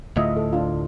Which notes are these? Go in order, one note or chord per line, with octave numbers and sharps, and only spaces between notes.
D2 A2 F4 D#5 E5
A4
D4 F4